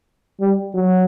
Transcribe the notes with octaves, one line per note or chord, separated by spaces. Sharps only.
G3
F#3